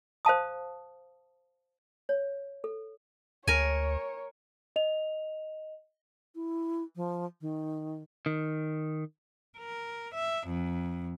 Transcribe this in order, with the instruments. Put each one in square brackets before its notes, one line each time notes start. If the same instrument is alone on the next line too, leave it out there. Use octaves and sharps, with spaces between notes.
[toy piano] C5 F5 A5 D#6
C#5
A4
[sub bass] D2 [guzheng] A#4 G#5 [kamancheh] C#5
[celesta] D#5 F7
[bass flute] E4
F3
D#3
[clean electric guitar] D#3
[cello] A#4
E5
F2